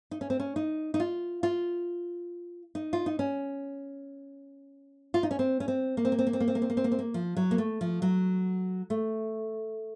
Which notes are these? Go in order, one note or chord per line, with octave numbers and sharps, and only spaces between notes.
D#4
C#4
C4
C#4
D#4
D#4
F4
F4
D#4
F4
D#4
C#4
F4
D#4
C#4
C4
C#4
C4
A#3
C4
A#3
C4
A#3
C4
A#3
C4
A#3
C4
A#3
C4
A#3
C4
A#3
F3
F#3
A#3
A3
F3
F#3
A3